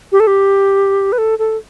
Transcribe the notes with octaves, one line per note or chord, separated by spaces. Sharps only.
G4
A4
G4
B4
A4
A4